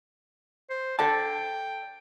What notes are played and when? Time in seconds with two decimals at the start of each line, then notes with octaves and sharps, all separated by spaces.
0.70 C5
0.99 A4 D5 G5 A5